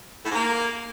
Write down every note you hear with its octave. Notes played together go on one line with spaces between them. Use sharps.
A2
G#2
A#3